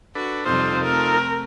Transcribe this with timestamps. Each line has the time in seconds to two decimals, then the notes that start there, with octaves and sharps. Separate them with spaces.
0.15 D4 F#4 A4 B4
0.46 F2 C3 G3 D#4 F4 A4 C5
0.84 A3 C4 A#4